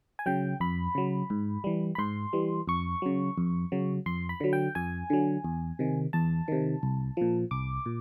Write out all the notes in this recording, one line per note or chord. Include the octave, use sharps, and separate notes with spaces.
G#5
C#3 F#3 G5
F2 B5
C#3 F#3
G#2
E3 G3
B5
G#2 C6
E3 G3
F2 C#6
C#3 F#3
F2
C#3 F#3
F2 C6
B5
D3 F#3
G5
F2 G#5
D3 F#3
E2
C3 D#3
E2 A5
C3 D#3
C2
A#2 F3
C2 D6
A#2